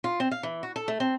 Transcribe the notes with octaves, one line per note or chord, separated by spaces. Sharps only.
F4
C4
F5
E3
F#4
A4
A3
C4